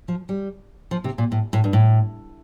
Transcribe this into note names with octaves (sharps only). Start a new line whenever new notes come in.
F3
G3
F3
C3
A#2
A2
A2
G2
A2